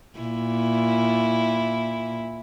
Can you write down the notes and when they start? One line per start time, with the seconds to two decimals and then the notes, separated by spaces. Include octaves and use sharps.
0.19 A#2 E4